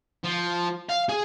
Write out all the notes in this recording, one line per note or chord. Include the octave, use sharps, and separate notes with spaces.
F3
F5
G#4